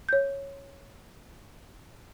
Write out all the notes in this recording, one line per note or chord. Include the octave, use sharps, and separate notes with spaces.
C#5 G6